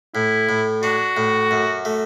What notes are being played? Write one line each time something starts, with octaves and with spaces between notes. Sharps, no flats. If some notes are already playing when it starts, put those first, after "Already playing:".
A2 E4
A2
D4 F#4
A2
F#2
A3